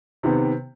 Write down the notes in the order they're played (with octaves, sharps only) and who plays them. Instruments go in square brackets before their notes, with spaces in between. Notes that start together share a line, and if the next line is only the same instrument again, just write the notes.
[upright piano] C3 D#3 B3